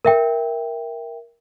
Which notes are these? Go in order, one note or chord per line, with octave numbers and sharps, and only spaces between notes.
A#4 E5 G5